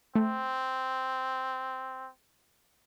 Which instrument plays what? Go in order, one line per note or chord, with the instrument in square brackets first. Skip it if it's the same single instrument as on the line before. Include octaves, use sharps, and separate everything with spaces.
[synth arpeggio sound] A3 [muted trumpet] C4